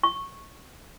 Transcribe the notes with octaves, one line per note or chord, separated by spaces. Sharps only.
C#6